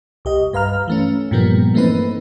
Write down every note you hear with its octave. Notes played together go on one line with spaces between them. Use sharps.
C2 G4 D#5
G2 B4 F5 A#5 F6
E3 A3 C#4
G2 A#2 F3 G3 A#3 B3
E3 A3 A#3 C4 D#4 B4